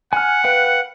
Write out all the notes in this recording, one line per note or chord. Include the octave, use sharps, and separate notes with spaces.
F#5 G#5 F6
B4 F5 G5